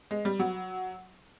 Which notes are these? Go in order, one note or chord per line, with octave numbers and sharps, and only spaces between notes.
G#3
G3
F#3